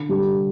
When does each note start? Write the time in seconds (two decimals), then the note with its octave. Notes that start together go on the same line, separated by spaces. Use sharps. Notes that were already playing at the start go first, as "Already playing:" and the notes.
Already playing: D3
0.09 G3 D4 G4